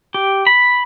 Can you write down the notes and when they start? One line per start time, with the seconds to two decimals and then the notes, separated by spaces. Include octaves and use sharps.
0.14 G4
0.47 B5